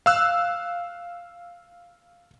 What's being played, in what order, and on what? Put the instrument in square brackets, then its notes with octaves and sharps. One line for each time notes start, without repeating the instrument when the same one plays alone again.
[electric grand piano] F5 E6 F#6